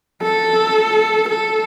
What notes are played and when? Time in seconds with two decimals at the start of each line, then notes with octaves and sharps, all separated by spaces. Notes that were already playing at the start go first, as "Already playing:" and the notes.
0.23 A4
1.29 A4